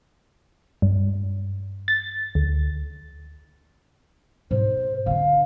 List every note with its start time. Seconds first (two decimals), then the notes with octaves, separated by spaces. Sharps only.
0.82 G2
1.88 A6
2.35 D2
4.51 G#2 B2 C5
5.06 D3 D4 F5